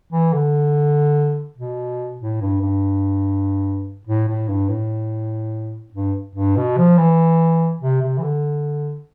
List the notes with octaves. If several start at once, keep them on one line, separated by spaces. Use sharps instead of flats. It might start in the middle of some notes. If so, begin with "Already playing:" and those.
E3
D3
B2
A2
G2
G2
A2
A2
G2
A2
G2
G2
B2
F3
E3
C3
C3
E3
D3